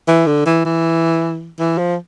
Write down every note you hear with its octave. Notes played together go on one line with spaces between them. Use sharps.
E3
D3
E3
E3
E3
F3